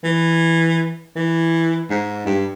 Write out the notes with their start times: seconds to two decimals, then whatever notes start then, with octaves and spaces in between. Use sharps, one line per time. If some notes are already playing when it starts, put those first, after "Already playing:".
0.04 E3
1.16 E3
1.90 G#2
2.26 G2